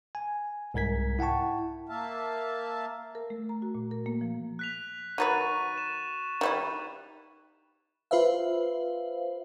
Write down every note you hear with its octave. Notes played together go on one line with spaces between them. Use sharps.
G#5
C2 G#2 A#4 G#6 B6
E4 F#5 G5 A5 C#6
A#3 E5 F5 A5
A#4
A3
A#5
F#4
A#2
A#4
A#3
F3
F#6 B6 F7
D#3 F#3 B4 F#6 A6 D#7
C#6
E7
D#3 G3 E4
F4 B4 C5 E5 F5